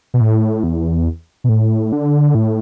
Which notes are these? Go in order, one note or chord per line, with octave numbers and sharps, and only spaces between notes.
B2
A2
E2
B2
A2
D3
A2